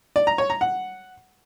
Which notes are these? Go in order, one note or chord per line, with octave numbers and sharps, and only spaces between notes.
D5
A#5
C#5
A#5
F#5